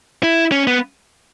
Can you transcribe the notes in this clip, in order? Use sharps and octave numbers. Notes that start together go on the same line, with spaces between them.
E4
C#4
B3